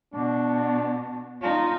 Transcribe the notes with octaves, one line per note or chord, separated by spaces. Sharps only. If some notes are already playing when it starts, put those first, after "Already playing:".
B2 D4
D#4 F4